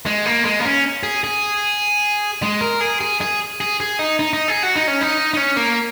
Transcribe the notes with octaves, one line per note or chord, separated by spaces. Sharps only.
G#3
A#3
G#3
A#3
C#4
G#4
G#4
G#3
A#4
G#4
G#4
G#4
G#4
G#4
D#4
D#4
D#4
G#4
F#4
D#4
C#4
D#4
D#4
C#4
A#3